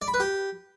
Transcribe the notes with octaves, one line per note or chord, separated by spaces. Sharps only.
D5
B5
B4
G4